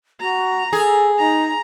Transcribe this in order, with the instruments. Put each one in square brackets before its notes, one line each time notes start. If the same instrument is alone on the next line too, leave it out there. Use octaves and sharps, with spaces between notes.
[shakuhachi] F#4 [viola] A#5
[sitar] G#4 [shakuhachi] A4
[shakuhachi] D#4 [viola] A#5